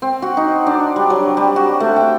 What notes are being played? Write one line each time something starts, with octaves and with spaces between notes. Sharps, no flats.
C4
F#4
D#4
D4
G3
F#3
G3
F#4
A3
G5